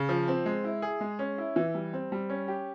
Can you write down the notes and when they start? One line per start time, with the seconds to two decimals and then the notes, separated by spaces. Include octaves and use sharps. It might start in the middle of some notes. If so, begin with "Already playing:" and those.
Already playing: C#3
0.09 F3
0.28 C4
0.46 G#3
0.64 E4
0.82 G#4
1.01 G#3
1.19 C#4
1.38 E4
1.56 E3
1.75 G3
1.93 C4
2.12 G3
2.30 C#4
2.48 G4